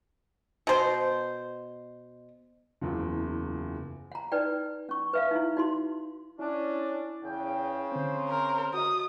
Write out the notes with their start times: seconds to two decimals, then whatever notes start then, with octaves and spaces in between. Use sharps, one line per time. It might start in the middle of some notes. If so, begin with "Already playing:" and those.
0.67 B2 C5
2.81 F#1 E2 F4
4.12 F#5 A#5
4.32 D#4 B4 D5 G5
4.89 C#4 C#6
5.13 B4 E5 F5
5.31 D#4 E4
5.57 D#4 F#4 C6
6.39 C#4 D4 E4
7.24 E2 C#3 G5
7.92 D3 C4 C5
8.29 A#4
8.74 F#4 D#5 D#6